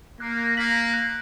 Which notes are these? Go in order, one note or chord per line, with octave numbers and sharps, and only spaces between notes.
A#3 F#6
A#3 B6 F#7
F#6